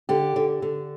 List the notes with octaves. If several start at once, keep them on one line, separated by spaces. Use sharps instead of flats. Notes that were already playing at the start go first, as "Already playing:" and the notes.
D3 G4
D3
D3